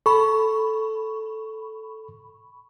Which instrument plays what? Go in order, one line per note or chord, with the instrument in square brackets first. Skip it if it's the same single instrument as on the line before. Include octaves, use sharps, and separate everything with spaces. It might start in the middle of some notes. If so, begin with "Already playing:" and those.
[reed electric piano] A4 [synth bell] B5 C#6